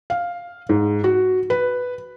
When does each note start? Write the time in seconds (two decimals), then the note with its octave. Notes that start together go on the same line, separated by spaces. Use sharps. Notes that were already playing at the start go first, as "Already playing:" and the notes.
0.10 F5
0.69 G#2
1.04 F#4
1.50 B4